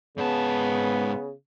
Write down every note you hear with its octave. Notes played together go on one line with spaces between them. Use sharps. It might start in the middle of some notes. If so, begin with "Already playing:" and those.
G#2 C#3 B3 A5